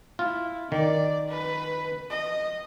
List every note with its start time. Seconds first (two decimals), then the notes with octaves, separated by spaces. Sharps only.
0.19 E4 F4
0.72 D#3 D5
1.29 B4
2.10 D#5